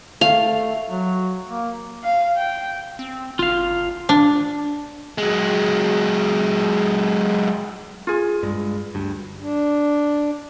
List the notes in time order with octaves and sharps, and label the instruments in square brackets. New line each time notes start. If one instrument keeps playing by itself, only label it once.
[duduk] A3 [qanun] F5
[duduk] F#3
A#3
[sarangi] F5
G5
[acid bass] C4
[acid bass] G1 [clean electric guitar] F4 F5
[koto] D4
[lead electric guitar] F#3 G#3
[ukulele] F4 G#4
[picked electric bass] G2 G#3
D2 G2
[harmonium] D4